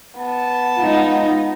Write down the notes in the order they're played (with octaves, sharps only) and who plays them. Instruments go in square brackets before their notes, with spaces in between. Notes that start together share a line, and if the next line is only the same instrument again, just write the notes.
[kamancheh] B3 [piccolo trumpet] A5
[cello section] G#3 D#4 [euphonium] F4